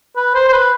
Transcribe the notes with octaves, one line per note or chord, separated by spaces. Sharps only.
B4
C5
C5
B4